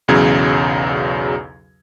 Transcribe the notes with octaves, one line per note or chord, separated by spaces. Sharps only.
B1 E2 C#3 F#3 G#6